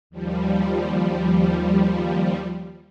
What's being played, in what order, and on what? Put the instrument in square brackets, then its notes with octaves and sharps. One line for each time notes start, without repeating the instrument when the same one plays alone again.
[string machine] D#2 F3 G3